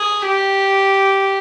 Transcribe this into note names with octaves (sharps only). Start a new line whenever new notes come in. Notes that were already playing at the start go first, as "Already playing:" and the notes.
Already playing: G#4
G4